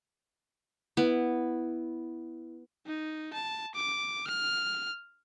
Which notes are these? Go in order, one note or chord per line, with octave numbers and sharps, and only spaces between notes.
B3 E4
D#4
A5
D6
F6